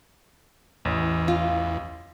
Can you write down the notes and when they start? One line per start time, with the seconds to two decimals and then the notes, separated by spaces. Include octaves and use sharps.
0.85 A1 E2
1.28 F4